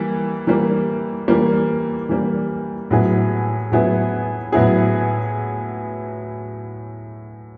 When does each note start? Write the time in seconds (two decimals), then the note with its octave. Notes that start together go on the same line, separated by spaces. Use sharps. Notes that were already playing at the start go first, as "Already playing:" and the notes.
Already playing: E3 G3 A#3
0.47 E3 G3 A#3
1.28 E3 G3 A#3
2.09 E3 G3 A#3
2.91 A2 F#3 B3 E4 G#4
3.71 A2 F#3 B3 E4 G#4
4.53 A2 F#3 B3 E4 G#4